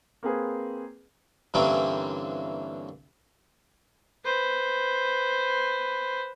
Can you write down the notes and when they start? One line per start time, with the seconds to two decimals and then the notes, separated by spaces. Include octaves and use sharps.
0.23 A#3 C4 G#4 B4
1.54 G2 D3 E3 A#3 C4 C#4
4.25 B4 C5